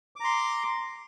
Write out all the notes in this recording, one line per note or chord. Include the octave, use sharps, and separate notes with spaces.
A#5 C6 D6